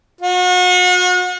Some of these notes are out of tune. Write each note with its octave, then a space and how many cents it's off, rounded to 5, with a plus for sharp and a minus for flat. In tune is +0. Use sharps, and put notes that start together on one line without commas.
F#4 -40